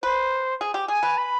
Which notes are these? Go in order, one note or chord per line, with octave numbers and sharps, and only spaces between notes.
B4 C5
G#4
G4
G#4 G#5
B4
B5